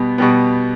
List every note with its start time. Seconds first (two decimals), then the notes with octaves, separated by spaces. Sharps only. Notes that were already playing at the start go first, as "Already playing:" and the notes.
Already playing: B2 G3 B3
0.18 B2 G3 B3